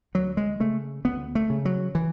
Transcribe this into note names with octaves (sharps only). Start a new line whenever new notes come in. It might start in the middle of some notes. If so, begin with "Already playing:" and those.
D2 F#3
G#3
C#3 A3
D2 B3
A3
C#3
F#3
E3